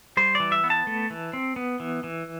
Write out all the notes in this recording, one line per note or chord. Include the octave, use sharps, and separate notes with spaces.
G3 C5
D5
E3
E5
B3
A5
A3
E3
C4
B3
E3
E3